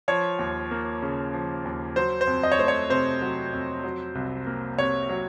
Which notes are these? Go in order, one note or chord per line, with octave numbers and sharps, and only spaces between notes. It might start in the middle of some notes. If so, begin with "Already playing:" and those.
F3 C#5
D#2
A#3
C#3
F3
D#2
F#3 C5
C5
F2
D#5
C#5
A3 C5
C#5
C3 C5
F#3
F2
F#3
C2
A#3
C3 C#5
F#3